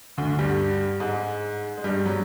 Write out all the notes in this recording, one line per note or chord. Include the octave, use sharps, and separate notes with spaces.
D2 D3
G2 G3
G#2 G#3
G#3
G2 G3
F#3